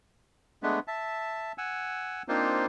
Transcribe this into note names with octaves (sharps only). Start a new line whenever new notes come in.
G#3 A3 B3 D4 B4
E5 A5
F#5 G#5 E6
A#3 C4 D4 D#4 F4 C5